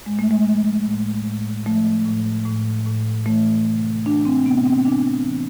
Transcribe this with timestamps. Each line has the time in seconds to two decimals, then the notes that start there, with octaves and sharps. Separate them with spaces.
0.06 A2 G#3
0.19 A3
0.31 G#3
0.46 F3
0.86 A2
1.26 A2
1.66 F3 A3
2.05 A2
2.46 A2
2.86 A2
3.26 E3 A3
3.66 C3
4.06 E3 D4
4.25 C4
4.46 C3 B3
4.66 C4
4.85 E3 D4
5.26 E3